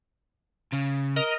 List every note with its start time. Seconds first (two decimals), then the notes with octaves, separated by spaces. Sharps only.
0.72 C#3
1.16 A#4 D#5 F6